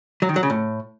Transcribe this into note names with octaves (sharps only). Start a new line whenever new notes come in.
F#3
D#3
F#3
C#3
A2